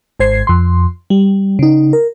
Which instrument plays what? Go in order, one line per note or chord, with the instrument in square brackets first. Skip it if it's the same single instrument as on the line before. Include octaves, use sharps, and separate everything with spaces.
[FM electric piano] G#1 G#2 C5 G#6 C7
F2 C6
G3
C#3 D#4
A#4